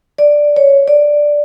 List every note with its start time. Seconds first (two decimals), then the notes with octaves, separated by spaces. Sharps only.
0.18 D5
0.56 C#5
0.88 D5